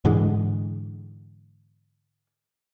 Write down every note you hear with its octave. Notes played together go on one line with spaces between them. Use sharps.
G#2 D3 E3 G#3